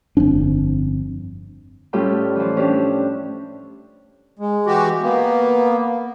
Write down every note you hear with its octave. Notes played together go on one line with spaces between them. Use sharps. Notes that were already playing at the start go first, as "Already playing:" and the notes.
G1 F2 C4 D4
A2 G3 C#4 F4 G4 A4
E3 F3
C#4 D4 G4
G#3
E3 F#4 G4
A#3 B3